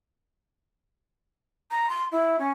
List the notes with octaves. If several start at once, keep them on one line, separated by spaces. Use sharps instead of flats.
A#5
C6
E4
C#4